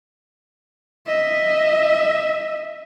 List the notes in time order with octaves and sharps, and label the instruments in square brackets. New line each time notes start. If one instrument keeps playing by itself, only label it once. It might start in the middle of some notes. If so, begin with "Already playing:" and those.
[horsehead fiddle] D#5 E5